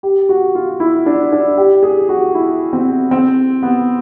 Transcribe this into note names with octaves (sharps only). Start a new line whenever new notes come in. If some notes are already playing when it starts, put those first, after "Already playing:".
G4
F#4
F4
E4
D4
D4
G4
G#4
F#4
E4
C4
C4
B3